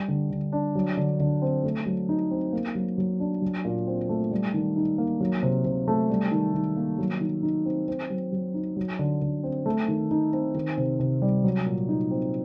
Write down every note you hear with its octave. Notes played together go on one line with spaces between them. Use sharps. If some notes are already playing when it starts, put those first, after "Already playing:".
Already playing: G3
D3
D3
D4
F#3
D3
D3
C4
A3
F#3
D#4
C4
A#3
F#3
F#3
D4
F#3
A#2
C4
A3
G3
D#3
D#4
A#3
F#3
C3
C3
A3
G3
D#3
D#3
A#3
F#3
D#3
D#4
C4
C4
F#3
F#3
D#4
F#3
D3
D3
C4
A3
D#3
D#4
C4
D#3
C3
C3
G3
F#3
A#2
D#4
C4